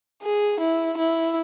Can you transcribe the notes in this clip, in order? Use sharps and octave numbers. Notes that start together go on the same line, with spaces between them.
G#4
E4
E4